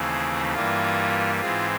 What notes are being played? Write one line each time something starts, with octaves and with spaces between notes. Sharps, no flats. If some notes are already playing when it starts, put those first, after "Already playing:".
Already playing: D#2 C#3 E3 A3 C4 G#4
G2 E3 G3 A#3 F4
G#2 E3 G#3 C4 F4